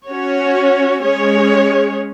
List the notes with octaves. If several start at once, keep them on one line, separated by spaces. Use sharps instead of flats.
C#4 F#4 C#5
G#3 C#4 G#4 C#5